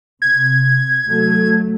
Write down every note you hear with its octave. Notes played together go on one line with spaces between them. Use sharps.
C3 G#6
F#3 A3